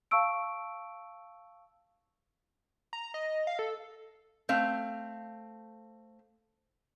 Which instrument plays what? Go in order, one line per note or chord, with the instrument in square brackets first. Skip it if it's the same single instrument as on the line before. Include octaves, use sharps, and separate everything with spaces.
[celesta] F5 A5 C#6 E6 D7
[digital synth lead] A#5
D#5
F5
A4
[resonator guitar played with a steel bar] A3 C4 F5